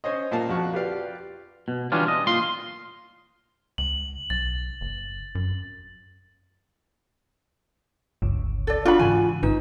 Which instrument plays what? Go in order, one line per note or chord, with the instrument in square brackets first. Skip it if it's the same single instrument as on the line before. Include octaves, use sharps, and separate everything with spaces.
[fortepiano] C#4 C5 C#5 D#5
A#2 A#3 F5 A5
F2 F#4
F4 G4 B4 D5 F5
[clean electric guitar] B2
E3 G3 C#4 D4 F4
D#5
A#2 F4 C6
[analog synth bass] C#2 [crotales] F#7
[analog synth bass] B1 [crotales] A6
[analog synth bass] F#1
F#2
[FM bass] G1 [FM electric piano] C#2 C#3
[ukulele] A4 D5
[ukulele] D4 F#4 B5 [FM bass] F4
[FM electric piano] G#2 C#3 E3 [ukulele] G#5
[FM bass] G#1 [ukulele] D#4 [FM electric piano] B4